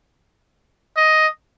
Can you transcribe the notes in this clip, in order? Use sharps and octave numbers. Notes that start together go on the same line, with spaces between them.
D#5